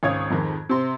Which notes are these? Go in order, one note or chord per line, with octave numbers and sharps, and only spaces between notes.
G#1 C#2 C#5 F5 D#6 G#6
F2 G#2 D#3
C3 C4 C6